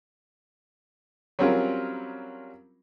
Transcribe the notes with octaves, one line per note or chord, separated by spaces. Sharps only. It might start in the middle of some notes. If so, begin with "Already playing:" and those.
F#3 G3 C4 C#4 F4 A#4